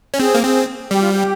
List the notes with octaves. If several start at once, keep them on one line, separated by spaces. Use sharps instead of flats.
C#4
C4 G#4
A#3
C4 G#4
G3 G4
F4
G4